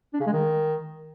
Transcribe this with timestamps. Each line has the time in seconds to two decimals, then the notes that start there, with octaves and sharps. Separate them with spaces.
0.14 D4
0.20 C#3
0.27 G#3
0.33 D#3